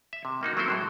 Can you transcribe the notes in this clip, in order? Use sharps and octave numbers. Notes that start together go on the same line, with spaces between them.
E5
C3
G3 A#3 D#4 F#4
F#3 A#3 C4 E4 A4 C5
A2 F#3 G#3